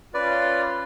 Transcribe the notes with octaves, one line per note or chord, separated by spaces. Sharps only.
C#4 F4 B4 D5